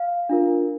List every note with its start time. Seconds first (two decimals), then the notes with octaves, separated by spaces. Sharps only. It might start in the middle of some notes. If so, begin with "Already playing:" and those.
Already playing: F5
0.29 D4 F4 A#4